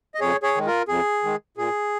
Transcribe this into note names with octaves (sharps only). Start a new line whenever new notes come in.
D#5
F2 G#4 C#5
G#4 C#5
D#3 G#3
F4 A#4
F2 G#4
D#3 G#3
A#2 G#4